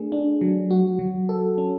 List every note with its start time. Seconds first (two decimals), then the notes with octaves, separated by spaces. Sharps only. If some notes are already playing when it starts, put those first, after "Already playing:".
Already playing: A3 D4 G#4
0.12 D4
0.41 F#3
0.71 F#4
0.99 F#3
1.29 A4
1.58 C#4